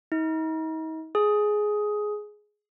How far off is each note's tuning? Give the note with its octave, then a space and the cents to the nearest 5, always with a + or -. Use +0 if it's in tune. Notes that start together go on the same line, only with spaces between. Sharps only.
D#4 +40
G#4 +10